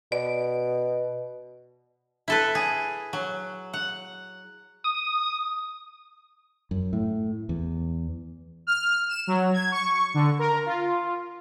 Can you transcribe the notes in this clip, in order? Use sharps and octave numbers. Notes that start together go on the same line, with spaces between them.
B2 D5
E4 A4 B4
G#4
F#3
F#5
D#6
F#2
A2
E2
F6
E7
F#3
G#6
C#6
D3
A#4
F4